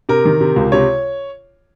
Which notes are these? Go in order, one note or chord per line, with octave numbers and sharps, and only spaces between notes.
C3 A#4
D#3
C3
C#2
C3 C#5